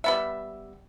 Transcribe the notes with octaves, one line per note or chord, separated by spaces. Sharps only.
G3 B3 E5